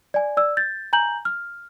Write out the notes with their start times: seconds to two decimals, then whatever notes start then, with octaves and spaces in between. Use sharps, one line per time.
0.14 D5 G#5
0.37 D5 E6
0.57 G6 A6
0.93 G#5 A#5 G6 F#7
1.25 F6